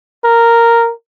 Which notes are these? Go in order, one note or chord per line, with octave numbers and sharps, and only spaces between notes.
A#4